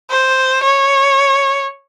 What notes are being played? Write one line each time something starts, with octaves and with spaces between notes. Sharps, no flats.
C5
C#5